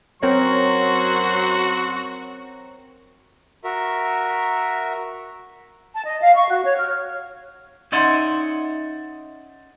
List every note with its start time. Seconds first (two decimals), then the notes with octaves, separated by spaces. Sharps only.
0.23 F#2 F#3 C4 F#4 A#4 C#5 C6
3.64 F#4 A#4 E5
5.94 A5
6.06 D#5
6.21 F5
6.35 C#6
6.49 F#4
6.64 C#5
6.77 F6
7.92 C#4 D#4 D5 E5 F#5 C6